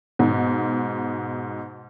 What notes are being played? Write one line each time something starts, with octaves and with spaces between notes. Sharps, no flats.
G#2 B2